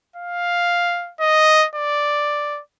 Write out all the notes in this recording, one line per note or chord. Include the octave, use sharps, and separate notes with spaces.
F5
D#5
D5